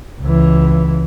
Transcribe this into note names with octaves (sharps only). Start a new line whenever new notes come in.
C#2 E3